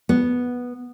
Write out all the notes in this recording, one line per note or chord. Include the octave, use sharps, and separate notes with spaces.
B3